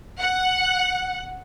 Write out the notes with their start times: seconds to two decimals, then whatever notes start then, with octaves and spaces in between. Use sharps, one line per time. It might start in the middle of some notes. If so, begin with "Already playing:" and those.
0.19 F#5